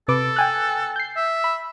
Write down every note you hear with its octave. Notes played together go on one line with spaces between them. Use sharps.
C3 A4 B4 D6
G5 G#5 F#6
G6 C7
E5
B5